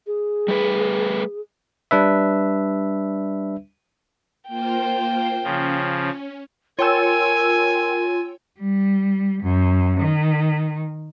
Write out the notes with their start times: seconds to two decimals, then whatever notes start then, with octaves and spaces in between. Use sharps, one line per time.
0.07 G#4
0.48 G3 A3 B4
1.91 G3 D4 B4 E5
4.48 A#3 F4 C5 G5
5.44 C#3 F3 C#4
6.79 F4 A#4 C#5 G5 G#5 E6
8.60 G3
9.43 F#2
10.00 D#3